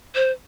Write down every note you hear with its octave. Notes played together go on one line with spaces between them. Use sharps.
C5